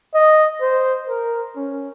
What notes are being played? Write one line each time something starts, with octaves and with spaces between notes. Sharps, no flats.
D#5
C5
A#4
C#4